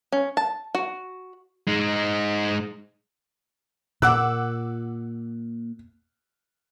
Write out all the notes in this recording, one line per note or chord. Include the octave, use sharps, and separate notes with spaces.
C#4
A5
F#4
G#3 D#4
A#2 F#5 D6 E6 F#6